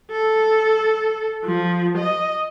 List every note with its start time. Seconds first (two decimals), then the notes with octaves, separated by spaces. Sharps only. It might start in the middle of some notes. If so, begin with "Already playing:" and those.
0.12 A4
1.45 F3
1.98 D#5